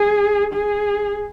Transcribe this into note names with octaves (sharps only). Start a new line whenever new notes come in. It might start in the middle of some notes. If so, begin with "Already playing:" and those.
Already playing: G#4
G#4